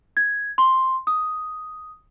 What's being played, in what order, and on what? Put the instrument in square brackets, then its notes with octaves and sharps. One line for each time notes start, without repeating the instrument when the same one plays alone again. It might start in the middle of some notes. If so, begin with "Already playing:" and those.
[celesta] G#6
C6
D#6